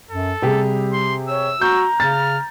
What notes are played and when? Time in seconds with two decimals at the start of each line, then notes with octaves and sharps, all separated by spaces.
0.11 F#2 A4
0.42 C3 G3 G4 G#4
0.93 C6
1.29 C#5 E6
1.61 F#4 A#5 G6
2.00 C#3 F6 A6